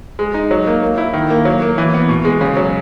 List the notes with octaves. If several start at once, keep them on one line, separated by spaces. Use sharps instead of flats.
G#3
D#4
F#3
A#3
A#3
E4
D#3
A#3
F#3
A#3
E3
B3
B2
G#3
C#3
F#3